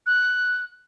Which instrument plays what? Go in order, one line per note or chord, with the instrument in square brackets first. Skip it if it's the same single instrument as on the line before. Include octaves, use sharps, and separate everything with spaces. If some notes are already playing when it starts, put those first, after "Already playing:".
[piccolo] F#6